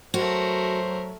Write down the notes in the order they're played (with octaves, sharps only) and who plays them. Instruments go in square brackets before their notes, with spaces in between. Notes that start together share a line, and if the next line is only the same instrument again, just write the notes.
[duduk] F#3 [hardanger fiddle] A3 A#4 [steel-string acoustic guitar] F#4 [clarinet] C5